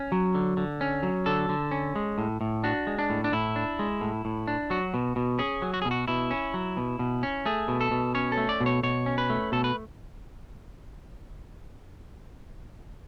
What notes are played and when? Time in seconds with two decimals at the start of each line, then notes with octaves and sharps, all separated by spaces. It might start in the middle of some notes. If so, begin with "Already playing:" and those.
Already playing: C#4
0.12 F#3
0.35 D3
0.57 D3
0.81 C#4
1.03 F#3
1.26 D3 A4
1.49 D3
1.71 C#4
1.96 G#3
2.18 A2
2.41 A2
2.64 D4 F#4
2.87 G#3
2.99 D4
3.10 A2
3.24 D4
3.32 A2 E4
3.56 D4
3.79 G#3
4.01 A2
4.25 A2
4.48 D4
4.70 F#3 F#4
4.94 B2
5.16 B2
5.39 C#4 G#4
5.62 F#3
5.74 F#4
5.82 G#4
5.85 B2
5.91 F#4
6.08 B2 E4
6.31 C#4
6.54 F#3
6.77 B2
6.99 B2
7.23 C#4
7.46 A3 G#4
7.68 B2
7.81 A4
7.91 B2
8.15 C#4 C#5
8.32 A4
8.37 A3
8.49 D5
8.61 B2
8.66 C#5
8.83 B2 C#5
9.06 C#4
9.18 B4
9.30 A3
9.52 B2 A4
9.64 B4